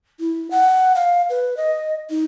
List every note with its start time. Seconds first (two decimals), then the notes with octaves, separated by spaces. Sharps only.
0.20 E4
0.51 F#5
0.95 F5
1.30 B4
1.57 D#5
2.10 D#4